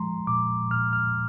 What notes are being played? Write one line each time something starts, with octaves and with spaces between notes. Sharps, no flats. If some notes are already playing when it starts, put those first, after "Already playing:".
Already playing: F3 G#3 A#5 C6
A#2 D6
A#2 F6
F6